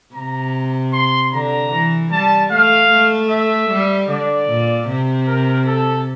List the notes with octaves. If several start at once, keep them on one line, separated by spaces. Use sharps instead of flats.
C3 A#5
C6
D3 A#5
E3
G3 A5
A3 F5
A3
E5
G3
D3 D5
A#2
C3
A#4
A4